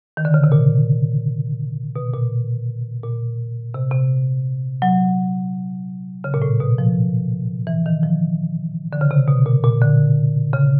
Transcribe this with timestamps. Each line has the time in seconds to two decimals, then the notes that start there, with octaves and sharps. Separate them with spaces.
0.17 D#3
0.25 D3
0.34 C#3
0.44 C3
0.52 A#2
1.96 B2
2.13 A#2
3.03 A#2
3.74 C3
3.92 C3
4.82 F#3
6.24 C#3
6.34 A#2
6.42 A2
6.60 B2
6.78 F3
7.67 E3
7.86 D#3
8.03 F3
8.93 D3
9.01 C#3
9.11 C3
9.28 B2
9.46 A#2
9.64 A#2
9.81 D3
10.53 C#3